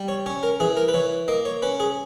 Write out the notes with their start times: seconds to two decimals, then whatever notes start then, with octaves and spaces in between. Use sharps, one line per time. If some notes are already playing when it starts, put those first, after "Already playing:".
Already playing: G3
0.08 C#5
0.26 C#4 C#5
0.43 A#4
0.60 E3 G#4
0.77 A#4
0.88 B4
0.94 E3 C#5
1.28 A#3 D#5
1.45 C#5
1.62 C#4 B4
1.80 G#4